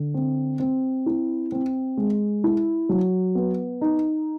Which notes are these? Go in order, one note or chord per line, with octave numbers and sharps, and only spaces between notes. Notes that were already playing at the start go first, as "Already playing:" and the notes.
Already playing: D3
C4
C4
E4
C4
G#3
E4
F#3
B3
D#4